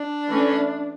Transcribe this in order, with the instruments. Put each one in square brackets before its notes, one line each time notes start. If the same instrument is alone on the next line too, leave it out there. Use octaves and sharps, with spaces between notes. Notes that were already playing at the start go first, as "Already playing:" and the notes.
Already playing: [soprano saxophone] D4
[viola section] E3 A3 C#4